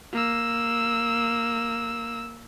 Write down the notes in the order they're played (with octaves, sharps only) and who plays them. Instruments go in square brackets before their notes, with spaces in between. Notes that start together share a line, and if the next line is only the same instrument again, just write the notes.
[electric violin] A#3 E6